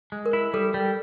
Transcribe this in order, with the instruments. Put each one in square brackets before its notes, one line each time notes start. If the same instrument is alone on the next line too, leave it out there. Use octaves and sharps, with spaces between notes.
[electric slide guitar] G#3
[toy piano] A#4
[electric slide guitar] E4
[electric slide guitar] G3 [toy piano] A4
[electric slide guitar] G3